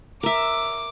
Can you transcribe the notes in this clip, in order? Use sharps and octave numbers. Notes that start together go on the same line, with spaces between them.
A#4 E5 D6